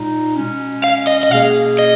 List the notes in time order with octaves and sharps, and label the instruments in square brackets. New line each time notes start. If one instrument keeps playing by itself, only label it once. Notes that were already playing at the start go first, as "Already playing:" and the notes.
Already playing: [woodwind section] A#2 G#3 D#4
B2 G#3 C#4
[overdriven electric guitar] F5
D#5
D#5
[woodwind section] B2 A#3 C#4 G#4 [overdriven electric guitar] F5
[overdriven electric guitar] D#5